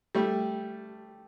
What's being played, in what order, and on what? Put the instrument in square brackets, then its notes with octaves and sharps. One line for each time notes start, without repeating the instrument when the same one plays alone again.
[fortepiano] G3 A3